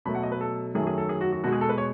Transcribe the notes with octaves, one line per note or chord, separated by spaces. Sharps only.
B2 F#3 A3 B5
F#5
D#5
B4
A4
F#2 D#3 F#3 A3 G#4
G#4
A4
G#4
F#4
F#4
B2 G#3 F#4
G#4
A4
B4
C#5